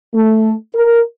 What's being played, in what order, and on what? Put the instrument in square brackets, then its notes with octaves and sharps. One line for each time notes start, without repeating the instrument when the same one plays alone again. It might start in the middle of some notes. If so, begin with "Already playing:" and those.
[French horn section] A3
A#4